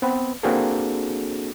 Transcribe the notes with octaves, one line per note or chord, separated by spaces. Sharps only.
B3 C4 B4
A#3 C4 D4 F#4 G#4 A4